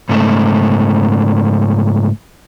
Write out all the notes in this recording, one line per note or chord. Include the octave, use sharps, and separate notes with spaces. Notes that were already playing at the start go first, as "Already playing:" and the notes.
G#2 C#3 A3